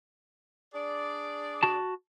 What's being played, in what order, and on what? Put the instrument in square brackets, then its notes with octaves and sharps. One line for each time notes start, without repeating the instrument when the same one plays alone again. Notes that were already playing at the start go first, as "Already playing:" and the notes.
[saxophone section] D4 G#4 D5
[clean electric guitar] F#4 A5